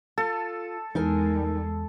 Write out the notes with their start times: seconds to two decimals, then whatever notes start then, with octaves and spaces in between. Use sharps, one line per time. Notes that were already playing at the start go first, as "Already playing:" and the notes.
0.18 F4 A4
0.95 E2 G#3 D#4 A#4 G#5